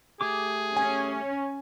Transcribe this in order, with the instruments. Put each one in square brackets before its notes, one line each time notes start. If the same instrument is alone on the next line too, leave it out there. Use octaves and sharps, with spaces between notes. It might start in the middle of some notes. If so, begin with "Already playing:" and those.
[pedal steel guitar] A3 G4 D6 [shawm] G#4
[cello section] C#4 [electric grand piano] G#5